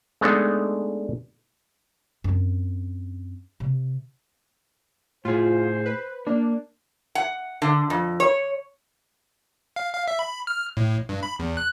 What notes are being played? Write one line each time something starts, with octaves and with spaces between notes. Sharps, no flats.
G#3 A3 B3 D4 D#4 A4
F#2 C4
C3
A2 F4 G#4 C5
B4
A#3 D4
F#5
D3
F2
C#5
F5
F5
E5
B5
F6
A2
G2
B5
E2
F#6